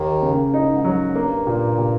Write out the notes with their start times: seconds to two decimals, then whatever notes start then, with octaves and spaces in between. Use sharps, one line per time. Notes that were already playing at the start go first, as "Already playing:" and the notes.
Already playing: D#2 D#3 A#3
0.23 C#3
0.54 A2 D#4
0.69 G#2
0.84 G#2 F#3
1.00 G#2
1.15 G2 A#3
1.47 A#2
1.78 A#2